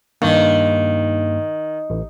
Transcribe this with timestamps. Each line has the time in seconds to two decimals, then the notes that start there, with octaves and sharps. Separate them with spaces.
0.22 G2 D#3 A#3
1.90 A1